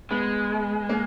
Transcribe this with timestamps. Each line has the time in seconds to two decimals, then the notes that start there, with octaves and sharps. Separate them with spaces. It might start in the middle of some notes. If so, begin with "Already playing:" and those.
0.11 G#3 B3
0.89 A#3